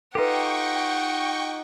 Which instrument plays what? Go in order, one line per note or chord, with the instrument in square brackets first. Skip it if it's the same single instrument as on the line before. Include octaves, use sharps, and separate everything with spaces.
[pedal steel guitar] D#4 F4 G4 [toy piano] A4 B4 [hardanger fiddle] F#5 [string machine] G5 C#6